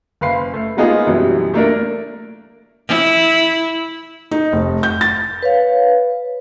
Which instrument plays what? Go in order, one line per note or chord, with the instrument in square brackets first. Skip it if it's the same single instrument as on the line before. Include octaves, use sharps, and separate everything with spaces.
[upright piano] F#1 B4 F5 C6 C7
A3
G#3 A#3 B3 D#4 F4 G#4
F#2 B2 E3 G3
A3 A#3 D4 A#4
[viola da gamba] E4
[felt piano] D#4
F1
G6
A6
[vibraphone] B4 C#5 F5